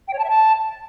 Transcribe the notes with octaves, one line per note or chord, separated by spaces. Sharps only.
G5
C#5
A5
E5
A5